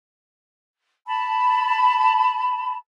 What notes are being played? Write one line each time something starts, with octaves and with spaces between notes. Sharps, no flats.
A5 B5